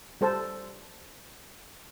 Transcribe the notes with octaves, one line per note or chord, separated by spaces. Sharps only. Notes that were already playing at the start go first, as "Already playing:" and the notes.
G3 A4 C5 A5